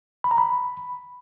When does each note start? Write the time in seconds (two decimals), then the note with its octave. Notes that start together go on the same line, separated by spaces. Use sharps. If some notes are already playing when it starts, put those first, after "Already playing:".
0.24 B5
0.31 A#5
0.38 B5